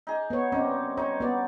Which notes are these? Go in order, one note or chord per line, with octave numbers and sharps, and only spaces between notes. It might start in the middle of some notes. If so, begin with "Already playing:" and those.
D#4 G#4
B3 C#5
G2 C4 C#4 D#4
D#4 C#5
B3 D5